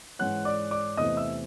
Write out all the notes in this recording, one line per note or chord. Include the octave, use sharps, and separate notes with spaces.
G#2 E3 G#3 C#4 F#5 F#6
D5 D6
D5 D6
E2 C3 E3 A3 C4 D#5 D#6
E5 E6